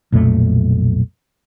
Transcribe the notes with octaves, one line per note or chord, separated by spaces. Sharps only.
B1 F2 A#2 A3